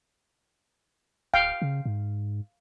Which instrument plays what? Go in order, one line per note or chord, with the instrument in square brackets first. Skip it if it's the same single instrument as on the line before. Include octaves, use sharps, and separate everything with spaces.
[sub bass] D1 [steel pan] F5 G5
[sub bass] C#3
G#2